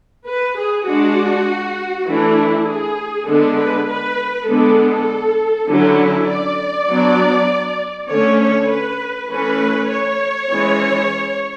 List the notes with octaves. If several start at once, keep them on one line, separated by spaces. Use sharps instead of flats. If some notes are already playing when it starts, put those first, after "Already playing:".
B4
G#4
G#3 D4 F#4
E3 A3 D4 E4
G#4
D3 G#3 B3 D4 A4
B4
B4
D3 G#3 B3 D4 A4
D3 F#3 C#4 E4
D5
F#3 B3 D4
D3 A3 C#4 C#5
C#5
B4
E3 A3 C#4 B4
C#5
E3 G#3 C#4